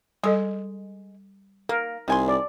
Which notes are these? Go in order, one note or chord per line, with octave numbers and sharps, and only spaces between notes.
G3 G#3 A4 D#5
A#3 A#4
C2 D#3 G#5 C6
D5